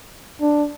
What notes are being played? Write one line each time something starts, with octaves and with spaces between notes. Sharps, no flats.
D4